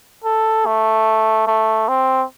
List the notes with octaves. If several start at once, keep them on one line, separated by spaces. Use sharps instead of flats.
A4
A3
A3
C4